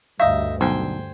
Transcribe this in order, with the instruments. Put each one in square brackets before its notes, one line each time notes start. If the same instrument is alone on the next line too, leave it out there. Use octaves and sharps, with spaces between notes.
[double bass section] D2 G2 D3 [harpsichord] D#4 E5 [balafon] F5
[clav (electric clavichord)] B1 [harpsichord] C5 G5 G#5